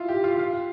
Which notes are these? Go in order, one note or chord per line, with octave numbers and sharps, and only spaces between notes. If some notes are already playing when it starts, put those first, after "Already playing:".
Already playing: E4 F4
G4
F4
F4